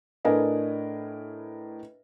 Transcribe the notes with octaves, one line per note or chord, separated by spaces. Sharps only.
A2 D4 A#4 B4 D#5 G#5